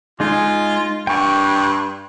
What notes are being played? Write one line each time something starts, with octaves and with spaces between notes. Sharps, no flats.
G#3 D#4 F4 G#4
G2 G5 C#6